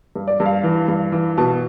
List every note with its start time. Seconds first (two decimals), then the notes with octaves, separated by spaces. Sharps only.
0.16 G2
0.28 D5
0.40 G2
0.46 F5
0.63 E3
0.88 G2
1.12 E3
1.38 B2 A5